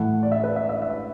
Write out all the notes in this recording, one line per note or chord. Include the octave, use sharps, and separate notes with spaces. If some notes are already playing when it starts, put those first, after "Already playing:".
Already playing: A2 E3 A3 F#5
D5
E5
B4
E5
E5
E5